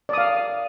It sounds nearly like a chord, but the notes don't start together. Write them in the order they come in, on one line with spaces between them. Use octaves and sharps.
D5 D#6 F5